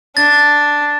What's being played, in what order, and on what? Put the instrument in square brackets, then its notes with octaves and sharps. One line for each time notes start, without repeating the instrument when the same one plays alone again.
[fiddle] D4 [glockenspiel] A6